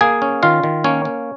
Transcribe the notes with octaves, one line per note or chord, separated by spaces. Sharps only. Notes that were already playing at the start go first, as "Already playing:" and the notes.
A#3 G#4 G#5
C#4
D#3 F4 F5
D#3
A#3 C#4 C#5
C#4